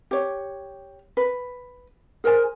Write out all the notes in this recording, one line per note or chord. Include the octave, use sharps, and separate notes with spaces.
G4 C#5
B4
G#4 A#4 C5 G#5